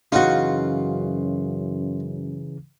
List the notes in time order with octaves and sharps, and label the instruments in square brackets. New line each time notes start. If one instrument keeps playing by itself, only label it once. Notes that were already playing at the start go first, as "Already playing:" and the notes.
[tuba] F#2 [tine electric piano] C#3 E3 [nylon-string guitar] D#4 F#4 [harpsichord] F4 F#5